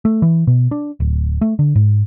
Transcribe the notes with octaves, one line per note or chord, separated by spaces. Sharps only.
A3
E3
B2
D4
D1
A3
D3
G#2